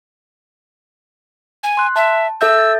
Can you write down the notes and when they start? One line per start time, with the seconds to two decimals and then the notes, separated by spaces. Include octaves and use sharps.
1.64 G#5
1.77 C6 F#6
1.96 E5 A5
2.41 A4 E5 E6 G6
2.59 A6